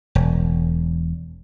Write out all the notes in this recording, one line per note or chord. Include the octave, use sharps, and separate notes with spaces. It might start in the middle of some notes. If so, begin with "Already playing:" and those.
E1